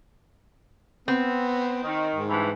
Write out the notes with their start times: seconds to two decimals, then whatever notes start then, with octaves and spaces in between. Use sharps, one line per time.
1.08 B3 C4
1.84 D#3
2.16 G#2
2.29 G2 E3